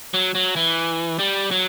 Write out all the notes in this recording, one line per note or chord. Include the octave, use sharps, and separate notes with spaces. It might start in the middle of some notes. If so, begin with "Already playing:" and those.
F#3
F#3
E3
G3
F#3